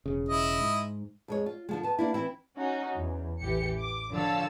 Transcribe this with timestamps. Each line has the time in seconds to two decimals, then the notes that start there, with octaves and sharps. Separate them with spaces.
0.06 E1 C#3
0.28 E4 D#5
0.60 G#2
1.28 F2 G#3 C#5
1.46 F4
1.69 D3 F3 G#3
1.83 B3 A5
1.99 A#3 D4 E4
2.14 E3 C4 E4
2.56 C#4 D#4 F#4
2.96 E2
3.41 A1 E3 G4 C#7
3.79 D6
4.14 D3 F3 C#5 F5 A5 E6